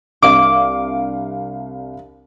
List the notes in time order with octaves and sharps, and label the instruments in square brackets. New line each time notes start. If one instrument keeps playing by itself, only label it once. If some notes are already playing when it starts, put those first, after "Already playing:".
[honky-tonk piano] C2 D4 F5 [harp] D6